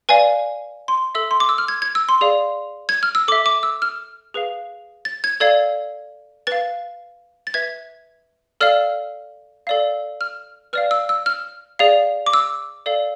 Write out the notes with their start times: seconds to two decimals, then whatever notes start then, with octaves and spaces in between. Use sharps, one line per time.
0.09 B4 D5 F5 G#5
0.88 C6
1.15 A4 E5 E6
1.31 C6
1.40 D6
1.49 E6
1.58 F6
1.68 G#6
1.82 G#6
1.95 E6
2.09 C6
2.21 G#4 D5 F5
2.89 G#6
3.03 F6
3.15 E6
3.28 A4 D6
3.32 E5
3.46 D6
3.63 E6
3.82 F6
4.34 G#4 B4 F5
5.05 A6
5.24 G#6
5.40 A4 D5 F5 G#6
6.47 B4 F5 A6
7.47 A6
7.54 B4 E5 G#6
8.61 A4 D5 F5 F6
9.67 A4 D5 F5
10.21 F6
10.73 B4 D5 F5 F6
10.91 E6
11.09 E6
11.26 F6
11.79 G#4 D5 F5
12.26 D6
12.33 E6
12.86 A4 D5 F5